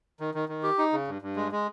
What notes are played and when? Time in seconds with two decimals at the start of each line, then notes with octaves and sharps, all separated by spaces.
0.20 D#3
0.34 D#3
0.49 D#3
0.63 G4
0.78 D#4
0.93 C#3
1.08 G2
1.22 G2
1.36 G#3
1.52 G#3